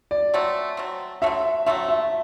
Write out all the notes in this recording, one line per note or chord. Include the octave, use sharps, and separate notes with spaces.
D5
F#3 A3 C4
F#3 A3 C4
F#3 A3 C4 E5
F#3 A3 C4 E5
E5